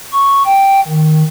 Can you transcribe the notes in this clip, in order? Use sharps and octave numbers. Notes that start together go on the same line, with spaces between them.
C#6
G5
D#3